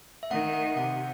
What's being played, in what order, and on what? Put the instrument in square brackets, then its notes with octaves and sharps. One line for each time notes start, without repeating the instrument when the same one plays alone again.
[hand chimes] E5
[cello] D#3 [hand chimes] F#5
[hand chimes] F#5
[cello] C3 [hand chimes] F#5